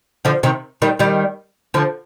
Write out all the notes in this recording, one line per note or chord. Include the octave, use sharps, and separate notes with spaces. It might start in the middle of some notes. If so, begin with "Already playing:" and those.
D3 F3
C3 D#3
D#3 G3
D#3 G3
D3 F3